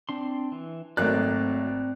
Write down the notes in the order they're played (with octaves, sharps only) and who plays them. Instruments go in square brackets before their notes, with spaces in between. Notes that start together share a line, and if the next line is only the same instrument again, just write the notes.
[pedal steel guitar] C4 D4 C6
E3
[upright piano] G#1 A#3 F#6 [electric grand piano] F#3 A3 [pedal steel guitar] C4 D5